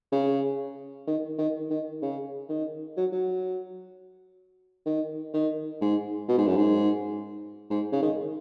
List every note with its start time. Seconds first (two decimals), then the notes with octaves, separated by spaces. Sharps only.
0.12 C#3
1.07 D#3
1.38 D#3
1.70 D#3
2.02 C#3
2.49 D#3
2.97 F#3
3.12 F#3
4.86 D#3
5.34 D#3
5.81 G#2
6.28 B2
6.38 G#2
6.47 F#2
6.56 G#2
7.70 G#2
7.92 C#3
8.02 D#3